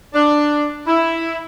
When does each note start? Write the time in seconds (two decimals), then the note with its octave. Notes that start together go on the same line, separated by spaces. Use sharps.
0.14 D4
0.87 E4